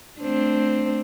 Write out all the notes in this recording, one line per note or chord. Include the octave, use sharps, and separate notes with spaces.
A3 C4 D4